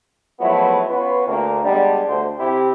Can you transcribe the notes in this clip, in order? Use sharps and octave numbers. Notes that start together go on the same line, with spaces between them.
F3 F#3 G#3 A3 B3 E4
B3 C#4 F4 F#4 B4
D2 A#3
G3 G#3 B3 D4
D2 D3 C5
C3 C4 E4 G4